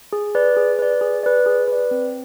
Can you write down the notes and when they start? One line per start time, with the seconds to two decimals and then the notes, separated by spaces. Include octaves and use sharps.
0.13 G#4
0.35 B4 D5
0.57 G#4
0.79 B4 D5
1.01 G#4
1.23 B4 D5
1.46 G#4
1.68 B4 D5
1.91 C4